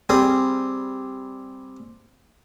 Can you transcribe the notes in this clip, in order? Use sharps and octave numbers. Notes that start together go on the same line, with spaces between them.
G3 C4 G#4